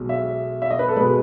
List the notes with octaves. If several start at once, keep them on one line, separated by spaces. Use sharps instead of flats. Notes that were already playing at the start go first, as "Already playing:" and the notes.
Already playing: B1 B2 G#3
E5
E5
D#5
B4
A4
B2 G#3 B4